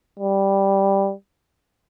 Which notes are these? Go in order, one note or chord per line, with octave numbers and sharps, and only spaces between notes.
G3